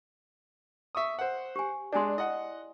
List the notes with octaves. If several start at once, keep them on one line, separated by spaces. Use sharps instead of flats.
E5 C#6 D#6
C5 F#5
G4 G#5
G#3 D4 D5 G#5 C6
E4 D#5 F#5